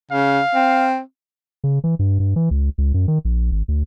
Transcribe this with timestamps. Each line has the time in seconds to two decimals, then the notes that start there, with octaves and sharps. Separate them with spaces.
0.11 C#3 F5
0.54 C4
1.64 C#3
1.84 E3
1.99 G2
2.20 G2
2.36 E3
2.51 C#2
2.78 C#2
2.94 F#2
3.08 D#3
3.25 A#1
3.52 G#1
3.68 D2